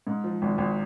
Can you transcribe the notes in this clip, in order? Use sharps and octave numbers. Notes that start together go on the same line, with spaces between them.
G#2
F3
G#1
G#1